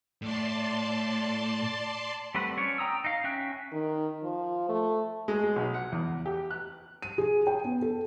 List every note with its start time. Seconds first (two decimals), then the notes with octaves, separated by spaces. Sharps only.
0.22 A2 D5 A5 C6
2.35 G3 A3 C4 B4 F#5
2.57 C#4 C#5 D5
2.78 G5 A#5 D#6 E6
3.04 D#4 F5
3.24 C#4 E5 G5 F#6
3.72 D#3
4.24 F3
4.69 A3
5.28 G#3
5.43 G#3
5.56 B1
5.74 F#5
5.92 E2
6.26 G4
6.51 F#6
7.02 D#7
7.18 G#4
7.47 G5
7.64 B3
7.82 A4